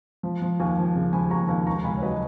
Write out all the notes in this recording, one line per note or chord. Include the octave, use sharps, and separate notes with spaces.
F3
F3
D#2 F5 G#5
F3
C#3
F3 G#5 B5
D#2 A#5 C#6
D#2
C#2 A#5 C#6
C#2 G#5 B5
C#5
F#3 B4 D#5